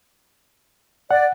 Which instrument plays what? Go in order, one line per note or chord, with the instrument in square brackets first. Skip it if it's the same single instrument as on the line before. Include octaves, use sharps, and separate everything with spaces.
[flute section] D5 [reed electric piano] F#5